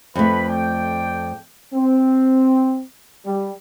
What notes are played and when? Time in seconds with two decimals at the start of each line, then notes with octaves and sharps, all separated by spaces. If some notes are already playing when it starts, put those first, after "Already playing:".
0.15 F2 A3 B4 B5
0.48 D5 G5
1.74 C4
3.26 G3